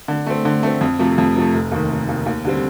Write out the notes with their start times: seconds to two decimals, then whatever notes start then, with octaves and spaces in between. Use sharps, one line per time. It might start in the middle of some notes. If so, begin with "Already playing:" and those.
0.08 D3
0.26 A3 C4
0.45 D3
0.63 A3 C4
0.81 F2
0.99 C3 F3 A3
1.18 F2
1.36 C3 F3 A3
1.54 F1
1.72 D#2 D#3
1.90 F1
2.09 D#2 D#3
2.26 D#2
2.45 D3 G3 C4